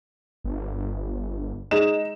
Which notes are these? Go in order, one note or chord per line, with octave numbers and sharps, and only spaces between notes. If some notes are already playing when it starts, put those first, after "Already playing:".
G1
G#3 D#4 E7